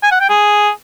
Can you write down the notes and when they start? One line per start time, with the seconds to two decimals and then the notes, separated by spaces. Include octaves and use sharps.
0.03 G#5
0.11 F#5
0.20 G5
0.29 G#4